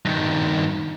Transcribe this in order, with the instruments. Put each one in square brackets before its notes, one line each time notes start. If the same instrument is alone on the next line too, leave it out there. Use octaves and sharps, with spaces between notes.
[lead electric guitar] G2 D#3